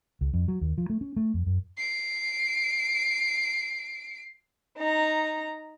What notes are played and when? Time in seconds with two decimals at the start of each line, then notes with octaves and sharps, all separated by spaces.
0.21 C#2
0.34 F2
0.48 F#3
0.61 D#2
0.78 F3
0.90 A3
1.01 C#4
1.16 A3
1.34 F2
1.46 F#2
1.77 C7 D7
4.79 D#4 A#5